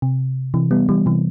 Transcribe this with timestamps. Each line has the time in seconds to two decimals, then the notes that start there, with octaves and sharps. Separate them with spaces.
0.02 C3
0.54 C3 E3
0.71 G3 B3
0.89 E3 G3
1.06 C3 E3